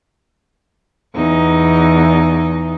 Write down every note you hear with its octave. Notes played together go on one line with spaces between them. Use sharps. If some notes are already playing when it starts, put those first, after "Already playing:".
E2 D#4